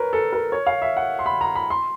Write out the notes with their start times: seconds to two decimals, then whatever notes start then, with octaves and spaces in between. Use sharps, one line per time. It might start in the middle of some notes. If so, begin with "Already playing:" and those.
Already playing: A#4 B4 C#5
0.13 A4
0.33 A#4
0.52 C#5
0.67 F5
0.82 E5
0.97 F#5
1.19 C6
1.26 B5
1.41 A#5
1.55 B5
1.70 C6